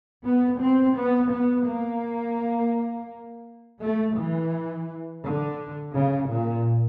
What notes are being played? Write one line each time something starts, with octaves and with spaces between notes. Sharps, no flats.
B3
C4
B3
B3
A#3
A3
E3
D3
C#3
A#2